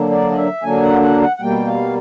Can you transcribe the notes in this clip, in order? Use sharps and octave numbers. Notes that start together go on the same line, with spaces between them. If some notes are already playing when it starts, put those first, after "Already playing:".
Already playing: D3 F#3 A#3 D4
D5
D#5
E5
D3 F#3 A#3 D4 G#5
F#5
F#5
F#5
F#5
B2 G3 A#3 G5
F5